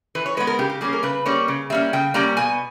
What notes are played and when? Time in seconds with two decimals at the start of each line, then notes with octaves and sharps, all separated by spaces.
0.15 E3 B4
0.26 C#5
0.37 G#3 B3 B4
0.47 A#4
0.59 C#3 G4
0.70 G4
0.81 G3 A#3 C#4 G#4
0.93 A#4
1.03 C#3 B4
1.25 G3 A#3 C#4 C#5
1.48 C#3
1.70 G3 A#3 C#4 E5
1.93 C#3 G5
2.14 G3 A#3 C#4 A#5
2.37 B2 G#5